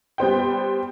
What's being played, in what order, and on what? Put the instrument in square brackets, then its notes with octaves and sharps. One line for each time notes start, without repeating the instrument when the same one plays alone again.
[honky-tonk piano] G3 B3 C5 G5